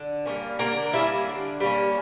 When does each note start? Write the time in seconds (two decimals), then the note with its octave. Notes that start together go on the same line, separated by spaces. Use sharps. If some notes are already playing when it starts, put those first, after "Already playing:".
Already playing: D3
0.26 G3 A#3 C#4
0.59 D3 A#3 A#4
0.93 G3 A#3 C#4 E4 E5
1.28 D3
1.60 G3 A#3 C#4